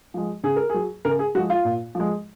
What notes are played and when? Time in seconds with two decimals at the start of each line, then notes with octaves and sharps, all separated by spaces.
0.14 F3 G#3
0.43 C#3 G#4
0.56 A#4
0.70 F#3 G#4
1.05 C#3 A#4
1.19 G#4
1.35 F3 G#3 F#4
1.50 F4
1.65 A#2
1.95 F3 G#3